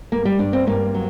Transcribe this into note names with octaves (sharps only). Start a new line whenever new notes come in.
G2 A#3
G3
G2 D4
C4
G2 A#3
F#3